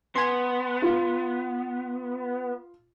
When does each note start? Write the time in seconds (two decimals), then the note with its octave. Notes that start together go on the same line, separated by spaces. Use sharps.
0.15 B3 G#5 C6
0.82 F4